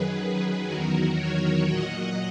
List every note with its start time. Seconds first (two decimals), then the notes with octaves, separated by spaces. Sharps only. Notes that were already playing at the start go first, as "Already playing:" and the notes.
Already playing: F#2 D#3 F#3 G#4 B4
0.67 E2 D#3 F#3 F#4 A#4
1.17 A#4 C#5
1.66 A#2 F#3 D#5 F#5